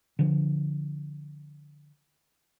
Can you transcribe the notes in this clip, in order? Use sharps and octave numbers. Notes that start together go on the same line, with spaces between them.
D3 F3